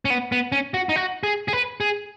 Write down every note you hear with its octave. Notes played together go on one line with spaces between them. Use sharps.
C#4
B3
B3
C#4
F#4
D#4
F#4
G#4
G#4
B4
G#4